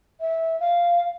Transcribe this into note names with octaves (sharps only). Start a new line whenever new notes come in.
E5
F5